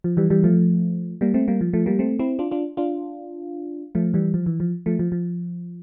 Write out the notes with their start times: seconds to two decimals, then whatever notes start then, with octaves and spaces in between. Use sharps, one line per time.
0.04 F3
0.17 E3 G3
0.30 E3 G3
0.44 F3 A3
1.21 G3 A#3
1.34 A3 C4
1.48 G3 A#3
1.61 F3
1.73 F3 A3
1.86 G3 A#3
1.99 A3 C4
2.19 C4 E4
2.39 D4 F4
2.51 D4 F4
2.77 D4 F4
3.95 F3 A3
4.14 E3 G3
4.34 F3
4.46 E3
4.60 F3
4.86 F3 A3
4.99 F3
5.12 F3